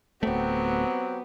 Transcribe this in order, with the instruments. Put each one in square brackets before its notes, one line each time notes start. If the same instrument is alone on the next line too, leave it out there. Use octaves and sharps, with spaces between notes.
[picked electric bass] D1 A3 [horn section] F#3 C4 G4 [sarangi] B3